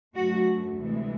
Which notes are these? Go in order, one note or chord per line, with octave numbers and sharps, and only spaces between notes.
F#2 D3 F#3 A3 F#4
D2 C3 E3 G#3